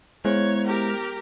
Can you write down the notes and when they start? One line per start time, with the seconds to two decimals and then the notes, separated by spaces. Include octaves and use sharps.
0.25 G#3 B3 E4 C5 C#5
0.65 G4 A#4